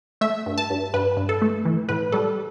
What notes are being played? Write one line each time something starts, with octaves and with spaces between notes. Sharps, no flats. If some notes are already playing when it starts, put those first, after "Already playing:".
A3 E5
G2
A5
G2
G2 B4
G2
A4
A3
E3
A2 B4
G3 A4